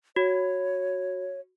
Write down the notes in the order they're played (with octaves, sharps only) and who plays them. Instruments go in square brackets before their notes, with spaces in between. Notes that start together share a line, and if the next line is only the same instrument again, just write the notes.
[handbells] F#4 [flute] C#5